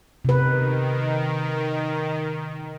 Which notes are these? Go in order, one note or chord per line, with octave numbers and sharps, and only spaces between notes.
C3 D#3 B4